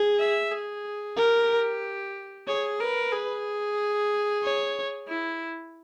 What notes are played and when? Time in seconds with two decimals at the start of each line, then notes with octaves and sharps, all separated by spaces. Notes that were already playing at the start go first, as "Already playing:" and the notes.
Already playing: G#4
0.20 E5
0.52 G#4
1.17 G4 A#4
2.48 G#4 C#5
2.80 A#4 B4
3.12 G#4
4.43 C#5
5.08 E4